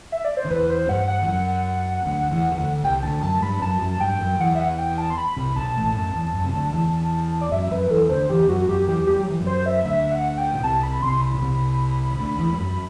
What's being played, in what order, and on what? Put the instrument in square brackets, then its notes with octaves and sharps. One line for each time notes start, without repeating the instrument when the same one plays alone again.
[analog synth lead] E5
D5
C5
[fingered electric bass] D3
[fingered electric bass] E2 E3 [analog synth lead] B4
[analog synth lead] C5
[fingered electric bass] G2 G3 [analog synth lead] F#5
[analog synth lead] F#5
[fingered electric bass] E3
F#2 F#3
D2 D3
E2 E3
E3
D2 D3
[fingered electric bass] C2 C3 [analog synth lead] G5
[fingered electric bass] D2 D3 [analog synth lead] A5
[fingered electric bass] F#2 F#3 [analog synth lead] A5
[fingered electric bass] G2 G3 [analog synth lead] B5
[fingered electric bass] F#2 F#3 [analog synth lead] A5
[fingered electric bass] F#2 F#3
[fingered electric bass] G2 G3 [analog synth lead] G5
[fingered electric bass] F#2 F#3
[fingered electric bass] E2 E3 [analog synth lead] F#5
[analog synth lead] E5
F#5
G5
A5
C6
B5
[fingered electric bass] C2 C3
[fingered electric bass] B1 B2 [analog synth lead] A5
[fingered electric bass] A1 A2
F#2
E2
F#2
C3
D2 D3
E2 E3
[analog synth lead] D5
[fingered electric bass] F#2 F#3 [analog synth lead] E5
[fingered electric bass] F#2 F#3 [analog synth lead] B4
[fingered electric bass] E2 E3 [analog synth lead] A4
[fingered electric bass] D2 D3 [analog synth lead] C5
[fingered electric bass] E2 E3 [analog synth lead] G4
[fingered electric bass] F#2 F#3 [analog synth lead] F#4
[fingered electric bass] F#2 F#3 [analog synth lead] G4
[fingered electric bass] E2 E3 [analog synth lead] G4
[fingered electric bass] G3 [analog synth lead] G4
[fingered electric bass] F#3
E3
F#2 F#3
[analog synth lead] C5
E5
[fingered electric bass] D2 D3 [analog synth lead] E5
[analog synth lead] F#5
G5
[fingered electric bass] B2
[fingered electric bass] C2 C3 [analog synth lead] A5
[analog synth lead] B5
[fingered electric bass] C2 C3 [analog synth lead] C6
[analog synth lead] B5
[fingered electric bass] B2
C2 C3
C3
D2 D3
E2 E3
G3
F#2 F#3